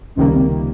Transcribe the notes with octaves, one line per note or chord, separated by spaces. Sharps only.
C#2 C3 D#3 G3 A#3 C#4
C4